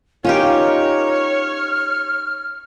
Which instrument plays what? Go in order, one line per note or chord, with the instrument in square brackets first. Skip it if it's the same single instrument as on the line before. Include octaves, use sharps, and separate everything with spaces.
[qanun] C#4 D#4 G4 [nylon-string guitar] F4 [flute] A#4 [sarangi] C#5
[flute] F6